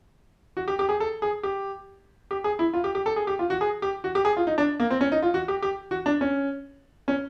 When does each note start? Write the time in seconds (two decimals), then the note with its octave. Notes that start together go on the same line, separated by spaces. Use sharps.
0.57 F#4
0.68 G4
0.79 G4
0.89 G#4
1.00 A4
1.22 G#4
1.43 G4
2.31 G4
2.44 G#4
2.59 E4
2.74 F4
2.84 G4
2.95 G4
3.06 A4
3.16 G#4
3.27 G4
3.39 F4
3.50 F#4
3.61 G#4
3.82 G4
4.04 F#4
4.15 G4
4.25 G#4
4.37 F4
4.47 D#4
4.58 D4
4.80 A#3
4.90 C4
5.01 C#4
5.12 D#4
5.22 F4
5.34 F#4
5.48 G4
5.62 G4
5.91 F#4
6.06 D4
6.21 C#4
7.08 C#4